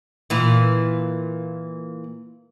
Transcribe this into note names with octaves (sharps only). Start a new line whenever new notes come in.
A#2 E3